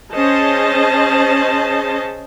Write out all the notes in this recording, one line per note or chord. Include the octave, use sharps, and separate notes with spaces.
C#4 G#4 C5 D#5 A5